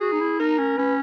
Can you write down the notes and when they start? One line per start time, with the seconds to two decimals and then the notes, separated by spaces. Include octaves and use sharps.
0.01 F#4 G#4
0.12 D#4
0.21 E4
0.40 D#4 A#4
0.58 C#4
0.77 C#4 B4